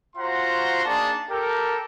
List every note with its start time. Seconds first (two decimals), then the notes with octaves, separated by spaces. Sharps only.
0.16 F4 F#4 C5 F#5 A#5 C6
0.83 A#3 D4 D#4 G#4 A5
1.29 G4 A4 A#4